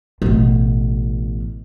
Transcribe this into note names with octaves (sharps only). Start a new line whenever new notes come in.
A1 B2